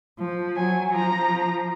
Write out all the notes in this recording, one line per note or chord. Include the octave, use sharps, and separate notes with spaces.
F3
F#3 G#5
F3 A#5